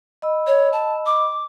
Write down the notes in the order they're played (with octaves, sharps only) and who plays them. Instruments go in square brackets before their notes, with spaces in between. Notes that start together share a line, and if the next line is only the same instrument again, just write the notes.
[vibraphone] D#5 B5 E6
[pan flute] C#5
A5
D6